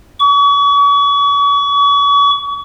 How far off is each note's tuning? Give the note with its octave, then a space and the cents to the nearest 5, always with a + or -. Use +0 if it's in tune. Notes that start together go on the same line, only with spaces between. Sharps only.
C#6 +40